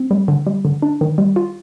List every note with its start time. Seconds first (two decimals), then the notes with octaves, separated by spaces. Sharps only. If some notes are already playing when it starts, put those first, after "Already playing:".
Already playing: C4
0.11 G3
0.28 D3
0.47 G3
0.65 D3
0.82 D4
1.01 D#3
1.18 G3
1.36 F4